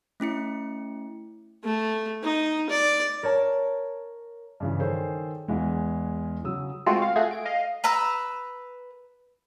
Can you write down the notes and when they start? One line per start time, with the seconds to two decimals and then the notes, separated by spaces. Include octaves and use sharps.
0.20 A3 C#4 E4 C#7
1.64 A3
2.24 D#4
2.70 D5
3.23 A#4 C#5 A5
4.60 G2 C#3 E3
4.79 D#3 G#4 A4 C5 C#5
5.48 E2 E3 G#3
6.44 C#3 F#3 D#6 E6
6.86 G#3 A3 C4 F4 F#4
7.02 F5
7.16 A3 F#4 G#4 D#7
7.31 D7
7.46 D#5 F5
7.84 B4 A#5 E6